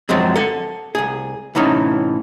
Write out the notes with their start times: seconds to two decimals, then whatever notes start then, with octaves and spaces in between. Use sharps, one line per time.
0.09 F#2 F3 F#3 G#3 C4
0.36 A4 F#5
0.95 C2 G#4
1.55 A2 C3 E3 C#4 D#4